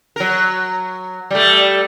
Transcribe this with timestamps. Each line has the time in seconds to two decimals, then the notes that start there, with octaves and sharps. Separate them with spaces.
0.16 F#3 A#4
1.31 G3 A3